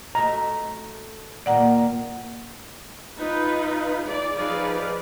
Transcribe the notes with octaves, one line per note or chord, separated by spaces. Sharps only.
A3 F#4 D#5 A#5
A#2 D#3 A#3 D5 F#5 A#5
D#4 F4 B4
G#4 D5
F3 D#4 G#4 B4 D5 F5